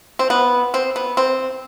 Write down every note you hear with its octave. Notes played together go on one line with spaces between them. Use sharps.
C4
B3
C4
B3
C4